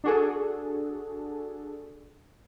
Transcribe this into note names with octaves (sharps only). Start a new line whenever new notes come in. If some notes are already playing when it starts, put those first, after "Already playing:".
D4 F#4 G#4 A4